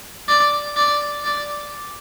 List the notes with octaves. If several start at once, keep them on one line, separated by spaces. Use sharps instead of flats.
D5
D5
D5